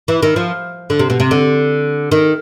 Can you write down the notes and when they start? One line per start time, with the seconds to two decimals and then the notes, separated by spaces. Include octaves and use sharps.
0.08 E3
0.23 D#3
0.36 F3
0.90 D3
0.99 C3
1.10 B2
1.20 C3
1.31 D3
2.12 D#3